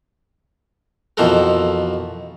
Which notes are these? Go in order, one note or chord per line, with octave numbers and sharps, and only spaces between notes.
F2 B2 E3 F4 A4 A#4